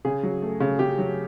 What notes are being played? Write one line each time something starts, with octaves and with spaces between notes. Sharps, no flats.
C#3 G#4
F#3
A3
C#3
C#3 G4
F#3